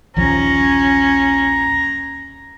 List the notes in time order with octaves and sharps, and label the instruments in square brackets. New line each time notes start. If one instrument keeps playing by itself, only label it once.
[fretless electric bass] A#1 D#2 F3 [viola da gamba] C#4 [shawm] A#5